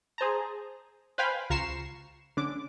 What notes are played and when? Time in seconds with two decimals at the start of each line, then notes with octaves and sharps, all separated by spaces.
0.18 G#4 C5 A5 A#5
1.18 B4 C5 F5 G5 G#5 B5
1.50 C#2 F4 A#5 C#6 C7 E7
2.37 D3 C#4 D4 D6